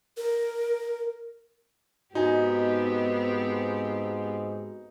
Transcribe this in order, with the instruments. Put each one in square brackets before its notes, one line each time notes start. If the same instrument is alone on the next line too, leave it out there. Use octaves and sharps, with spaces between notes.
[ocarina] A#4
[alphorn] G#2 [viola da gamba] B3 C4 G4 [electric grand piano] D#4 [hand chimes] F#4 G#5